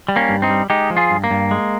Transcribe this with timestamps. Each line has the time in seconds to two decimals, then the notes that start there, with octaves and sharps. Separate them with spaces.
0.08 G3
0.16 A#3 C#4
0.29 G2
0.42 C4 D#4
0.50 G3
0.70 G#3 D#4 G4
0.90 F3
0.97 F4 G#4
1.10 G2
1.24 A#3
1.31 G2
1.51 G#3